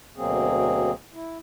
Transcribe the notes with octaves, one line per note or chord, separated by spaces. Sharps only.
D2 B2 F#3 A#3 C4 G#4
E4